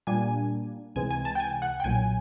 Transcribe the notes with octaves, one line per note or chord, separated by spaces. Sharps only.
A#2 G3 A#3 D4 G#5
C#2 C3 E3 G#3 G#5
G#5
A5
G5
G#5
F#5
G5
B1 A#2 F#3 G#5